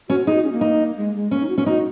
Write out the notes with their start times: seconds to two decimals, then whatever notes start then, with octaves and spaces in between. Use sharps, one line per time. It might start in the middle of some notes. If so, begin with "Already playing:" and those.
0.09 C#4 F#4
0.27 D#4 G#4
0.36 F#4
0.44 C#4
0.52 A#3
0.61 D#4
0.97 G#3
1.15 G#3
1.31 A#3 C#4
1.41 D#4
1.49 F#4
1.58 A#3 C#4
1.66 D#4 F#4